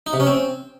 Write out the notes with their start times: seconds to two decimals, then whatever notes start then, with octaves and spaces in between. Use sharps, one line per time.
0.07 D#4
0.13 C3
0.20 C#4
0.27 C4